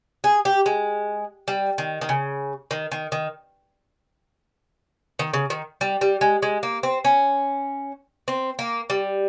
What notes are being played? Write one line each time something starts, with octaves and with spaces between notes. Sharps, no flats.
G#4
G4
G#3
G3
D#3
D#3
C#3
D#3
D#3
D#3
D#3
C#3
D#3
G3
G3
G#3
G#3
A#3
C4
C#4
C4
A#3
G3